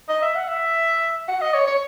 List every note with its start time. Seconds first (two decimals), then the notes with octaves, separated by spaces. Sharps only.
0.09 D#5
0.22 E5
0.36 F#5
0.48 E5
1.28 F#5
1.41 D#5
1.54 C#5
1.67 C#5